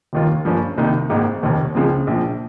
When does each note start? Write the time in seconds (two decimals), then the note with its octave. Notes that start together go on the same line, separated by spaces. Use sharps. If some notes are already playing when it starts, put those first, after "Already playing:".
0.13 F1 D#2 D#3 A#3 F4
0.45 G2 F3 A#3 C#4
0.77 C2 C3 D#3 A#3 D#4
1.10 G#1 G#2 D#3 A#3
1.43 F1 D#2 D#3
1.75 C#2 C#3 F3 C4
2.07 A#1 A#2 F3